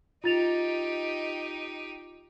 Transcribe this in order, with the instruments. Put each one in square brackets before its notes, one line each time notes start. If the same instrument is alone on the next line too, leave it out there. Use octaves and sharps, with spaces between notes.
[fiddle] D#4 G4 [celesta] F4 A6 F7